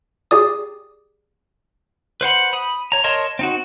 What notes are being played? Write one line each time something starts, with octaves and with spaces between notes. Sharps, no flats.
G4 G#4 D5 D#6
B4 C5 F#5 B5
B5 D#6
C#5 A#5
A#4 C#5 D#5 A5 C6
C4 D#4 F#4